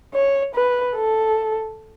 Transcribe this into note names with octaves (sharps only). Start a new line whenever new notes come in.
C#5
B4
A4